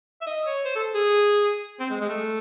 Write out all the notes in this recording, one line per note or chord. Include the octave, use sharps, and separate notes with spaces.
E5
D#5
C#5
C5
A4
G#4
C4
G#3
G#3
A3